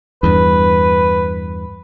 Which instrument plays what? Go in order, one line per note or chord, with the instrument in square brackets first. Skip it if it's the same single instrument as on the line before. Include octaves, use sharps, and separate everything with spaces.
[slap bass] E2 G2 [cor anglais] B4